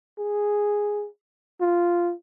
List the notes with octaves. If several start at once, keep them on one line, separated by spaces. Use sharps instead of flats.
G#4
F4